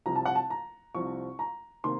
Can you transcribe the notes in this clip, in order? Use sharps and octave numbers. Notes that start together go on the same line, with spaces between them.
C2 C3 F3 A#5
A5
F#5
A5
A#5
C2 C3 F3 C#6
A#5
C3 D#3 A#3 C6